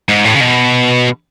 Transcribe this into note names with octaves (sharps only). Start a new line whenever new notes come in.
G#2
A2
C#3
B2